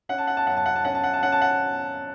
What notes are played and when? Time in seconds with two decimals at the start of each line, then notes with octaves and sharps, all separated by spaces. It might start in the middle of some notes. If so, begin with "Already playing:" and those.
0.09 C#4 F#5
0.18 A5
0.27 F#5
0.37 A5
0.47 F#2 F#5
0.56 A5
0.66 F#5
0.75 A5
0.85 C#4 F#5
0.94 A5
1.04 F#5
1.13 A5
1.23 C#4 F#5
1.32 A5
1.41 F#5